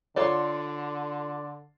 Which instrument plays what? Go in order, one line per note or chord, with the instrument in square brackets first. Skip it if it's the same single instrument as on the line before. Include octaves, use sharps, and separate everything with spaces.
[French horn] D3 [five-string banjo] F4 A4 C#5 [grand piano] D5 C6